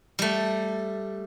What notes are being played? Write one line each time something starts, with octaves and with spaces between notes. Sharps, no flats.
G3 A3